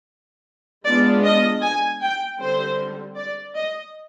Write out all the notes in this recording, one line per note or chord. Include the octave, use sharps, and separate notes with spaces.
G#3 B3 D4 F4 D5
D#5
G#5
G5
D3 G3 C4 C5
D5
D#5